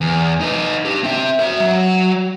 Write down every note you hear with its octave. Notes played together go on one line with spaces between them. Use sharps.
E2
D#4 B4
D4 G4
C4 E5
F#4 E5
F#3